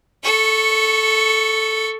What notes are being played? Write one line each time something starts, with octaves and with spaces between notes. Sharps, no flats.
A4 C#6